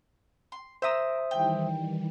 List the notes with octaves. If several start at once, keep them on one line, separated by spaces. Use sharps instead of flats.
C6
A#4 C5 E5 D#6 E6
D#3 E3 G3 G5